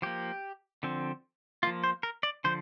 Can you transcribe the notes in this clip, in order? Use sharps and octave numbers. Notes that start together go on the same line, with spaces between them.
F3 A#3 G4
D3 F3 C4
F3 A#3 F4
C5
A#4
D5
D3 F3 C5